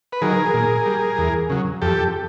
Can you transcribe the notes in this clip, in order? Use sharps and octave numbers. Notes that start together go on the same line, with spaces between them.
B4
D#3 F#3 G#4 A#4
A#2
G3
E2
C#3 F#3
F2 G4 A4